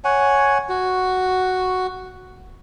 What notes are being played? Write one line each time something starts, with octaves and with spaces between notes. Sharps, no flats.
C#5 F#5 G#5
F#4